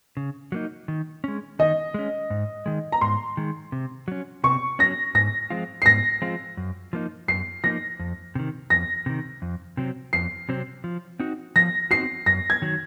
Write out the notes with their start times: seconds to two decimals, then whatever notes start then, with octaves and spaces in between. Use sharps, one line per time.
0.17 C#3
0.52 F#3 A#3 D#4
0.88 D#3
1.24 G#3 C#4
1.59 D#3 D#5
1.94 G#3 C#4
2.30 G#2
2.66 D#3 G#3
2.92 A#5
3.01 G#2 C6
3.37 D#3 G#3
3.72 C3
4.08 F#3 C#4
4.44 C3 C#6
4.79 F#3 C#4 A#6
5.15 G#2 A#6
5.50 F3 G#3 C4 F4
5.82 C7
5.86 G#2 A#6
6.22 F3 G#3 C4 F4
6.57 F#2
6.93 F3 A#3 D#4
7.28 F#2 C7
7.64 F3 A#3 D#4 A#6
7.99 F2
8.35 C3 D#3
8.70 F2 A#6
9.06 C3 D#3
9.42 F2
9.77 C3 F#3 C4
10.13 F2 C7
10.49 C3 F#3 C4
10.84 F3
11.20 C4 D#4 F#4
11.56 F3 A#6
11.91 C4 D#4 F#4 C7
12.26 F#2 A#6
12.50 G#6
12.62 D#3 F#3